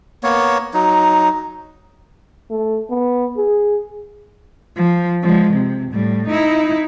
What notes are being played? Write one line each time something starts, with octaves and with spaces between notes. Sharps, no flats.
A#3 B3 C#5
F#3 D#4
A3
B3
G#4
F3
F3 G#3
C3
A2 G3
D#4 E4